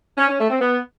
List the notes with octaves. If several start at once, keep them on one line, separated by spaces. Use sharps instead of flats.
C#4
C#4
A3
C4
B3